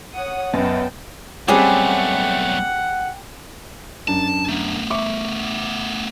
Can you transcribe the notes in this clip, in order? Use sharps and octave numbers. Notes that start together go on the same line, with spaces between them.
C#5 F#5 D#6
F#2 B3 D#5 G5 A5
B1 G3 A3 C4 C#4 G4 G#4 F#5
F#2 D4 A5
A3 B3
E5 C#6 D6